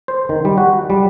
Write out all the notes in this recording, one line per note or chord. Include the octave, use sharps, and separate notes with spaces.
C5
D#3
G3
F#4
G3